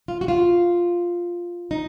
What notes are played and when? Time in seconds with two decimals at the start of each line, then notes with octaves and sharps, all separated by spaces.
0.08 F4
0.21 F#4
0.28 F4
1.71 D#4